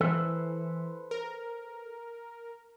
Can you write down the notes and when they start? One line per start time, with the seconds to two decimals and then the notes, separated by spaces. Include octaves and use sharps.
0.01 E3 A4 B4 C5
1.11 A#4